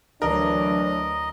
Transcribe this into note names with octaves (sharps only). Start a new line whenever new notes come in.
D2 E3 F#3 D4 A#4 D#5